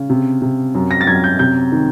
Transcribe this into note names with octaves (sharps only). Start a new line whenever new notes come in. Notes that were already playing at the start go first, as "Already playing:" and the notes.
Already playing: C#3
C3
C3
F#2
A#6
A6
F#2 G#6
G6
C3 G6
D#3